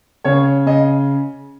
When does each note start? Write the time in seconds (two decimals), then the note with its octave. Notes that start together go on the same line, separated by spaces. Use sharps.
0.24 C#3 C#5
0.66 C#3 D#5